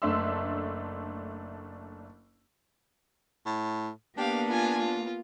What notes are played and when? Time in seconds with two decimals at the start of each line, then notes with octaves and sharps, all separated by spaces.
0.02 F#1 A3 D4 E5 C6 E6
3.46 A2
4.17 A#3 B3 D4 G4 F5
4.48 F4 G#5
4.78 F4